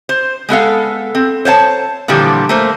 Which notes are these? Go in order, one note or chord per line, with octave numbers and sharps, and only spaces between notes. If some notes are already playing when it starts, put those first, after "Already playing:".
C5
G#3 B3 A4 F5
C4
C5 C#5 F5 A5
A#2 D3 E3 F3 G3
A3 A#3 C5